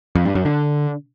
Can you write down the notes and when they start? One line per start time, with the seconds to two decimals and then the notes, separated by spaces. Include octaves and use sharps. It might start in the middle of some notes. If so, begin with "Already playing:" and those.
0.15 F2
0.25 G2
0.35 F#2
0.45 D3